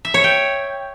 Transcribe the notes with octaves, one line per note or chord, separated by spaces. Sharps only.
E5
C#5
G5